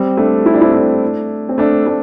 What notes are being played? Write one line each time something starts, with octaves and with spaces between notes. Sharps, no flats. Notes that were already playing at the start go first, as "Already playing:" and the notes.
Already playing: G3 C4
A3 D4
E4
D4
C4 E4
A3 D4
C4
A3 D4
A3 D4